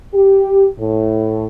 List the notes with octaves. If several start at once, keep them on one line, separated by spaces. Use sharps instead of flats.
G4
A2